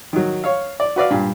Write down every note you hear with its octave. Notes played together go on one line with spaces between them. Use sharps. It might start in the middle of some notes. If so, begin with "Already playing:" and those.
D#3 F#3
C#5 F5
D5
F#4 B4 D5 F5
G2 A#2